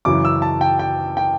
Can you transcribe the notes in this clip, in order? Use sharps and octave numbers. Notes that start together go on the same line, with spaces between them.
F#2 C#3 E3 D6
E6
A5
G5
G5
G5